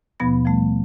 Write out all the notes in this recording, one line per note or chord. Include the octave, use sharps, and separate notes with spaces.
D#2 B2 F3 B3 B5 A#6
F3 G3 A3